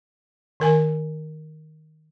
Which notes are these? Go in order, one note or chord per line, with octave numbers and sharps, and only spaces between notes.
D#3 A#4 G#5